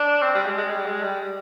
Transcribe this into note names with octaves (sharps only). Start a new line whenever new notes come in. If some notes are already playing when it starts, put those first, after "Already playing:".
Already playing: D4
C4
G3
G#3
G#3
G3
G#3
G3